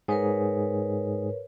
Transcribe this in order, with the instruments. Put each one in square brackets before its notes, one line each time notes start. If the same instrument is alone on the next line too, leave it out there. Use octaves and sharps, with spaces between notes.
[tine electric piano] G#2 G#4 [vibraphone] A#4 B4 C#5